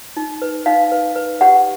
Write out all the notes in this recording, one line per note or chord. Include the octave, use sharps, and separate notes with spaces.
D#4
B4
D#4 F5
B4
B4
G4 F#5